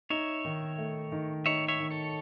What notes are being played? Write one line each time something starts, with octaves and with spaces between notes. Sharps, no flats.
D#4 C#5 E5
D#3
A3
D#3
D#4 C#5 E5
C#5 E5
D#3
A4 C#5